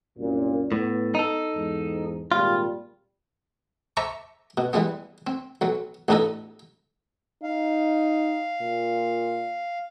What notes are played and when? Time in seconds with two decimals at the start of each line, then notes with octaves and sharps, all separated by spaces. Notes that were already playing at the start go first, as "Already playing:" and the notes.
0.18 C2 F#2 A#2
0.72 A2 B3
1.15 D#4 A4
1.56 E2 G#2
2.32 G#1 A#2 G3 F4
3.97 C5 E5 A5 A#5 C#6 D6
4.58 B2
4.73 E3 G3 G#3 B3
5.27 C4
5.61 B1 F#3
6.08 A1 E2 D4 D#4 A4 D#5
7.43 D#4 F5
8.61 A#2